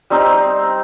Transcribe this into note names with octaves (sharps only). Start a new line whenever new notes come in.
G3 C4 D#4